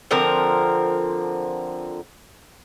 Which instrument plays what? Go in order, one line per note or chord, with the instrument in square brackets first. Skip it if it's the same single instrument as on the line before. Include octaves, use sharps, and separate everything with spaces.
[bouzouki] D3 F3 C4 A#4